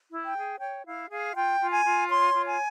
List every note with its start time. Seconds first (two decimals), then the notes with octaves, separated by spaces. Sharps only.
0.12 E4
0.24 G5
0.37 G#4
0.60 C#5 G5
0.85 E4 F5
1.10 G#4 F5
1.35 F4 G5
1.60 F4
1.72 G#5
1.84 F4
2.09 C#5 C6
2.34 F4
2.46 G#5